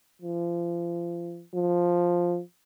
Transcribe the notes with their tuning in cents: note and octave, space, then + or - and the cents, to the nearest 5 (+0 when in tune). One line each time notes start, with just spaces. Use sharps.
F3 -30
F3 +5